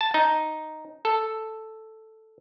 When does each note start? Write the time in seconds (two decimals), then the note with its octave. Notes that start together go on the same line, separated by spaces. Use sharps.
0.01 A5
0.14 D#4
1.05 A4